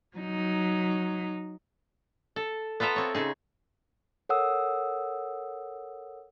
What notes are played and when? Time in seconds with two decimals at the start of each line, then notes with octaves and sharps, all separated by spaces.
0.17 F#3 D#4
2.36 A4
2.80 B3 F4 A4 E5 A#5
2.96 C4 C#5
3.15 C#3 D#4 G#4
4.29 A4 A#4 C#5 F#5 D#6 E6